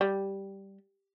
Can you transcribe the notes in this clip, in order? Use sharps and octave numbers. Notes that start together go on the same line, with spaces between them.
G3